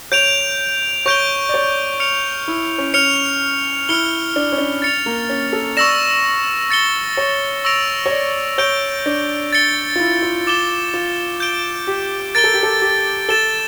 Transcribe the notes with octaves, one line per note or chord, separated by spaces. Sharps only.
C#5 G6 D7 F7
C#5 C#6 G6 D7 G7
D5
C#5
F6 C#7 F7
E4
C#4
C#4 F6 C#7 F7
E4 F6 C#7 G7
D4
C#4
D4
A6 C#7 F7
A#3
C#4
A4
D5 C#6 E6 A#6 E7
A6 C#7 G7
C#5
C#6 E6 A#6 D7 F7
C#5
D5
C#5 G6 D7 G7
D4
A6 C#7 G7
F4
E4
F4
D6 A6 E7 G7
F4
G6 D7 G7
G4
A#4 A6 D7 G7
A4
G4
A4
G4
A4 A6 E7 G7